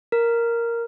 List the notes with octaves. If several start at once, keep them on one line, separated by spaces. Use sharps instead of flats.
A#4